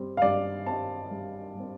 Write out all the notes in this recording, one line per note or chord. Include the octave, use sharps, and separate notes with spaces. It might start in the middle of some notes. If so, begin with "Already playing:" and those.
Already playing: G2 G3 C4
F5
G2 D5
G3 C4 A5
G2
G3 C4